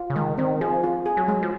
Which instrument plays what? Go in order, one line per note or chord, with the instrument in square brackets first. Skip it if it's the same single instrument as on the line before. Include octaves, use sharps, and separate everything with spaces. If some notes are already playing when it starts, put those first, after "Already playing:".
Already playing: [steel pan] F4
[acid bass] C#3
[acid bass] D#3 [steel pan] G#3
[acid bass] D#3 [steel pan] C4
[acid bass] F3 [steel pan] G#4
[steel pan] F4
G#4
[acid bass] F#3
[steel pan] G#3
[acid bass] F3